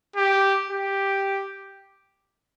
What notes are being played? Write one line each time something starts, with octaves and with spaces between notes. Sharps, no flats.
G4
G4